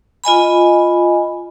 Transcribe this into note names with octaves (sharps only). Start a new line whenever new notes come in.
F4 D#5 G#5 B5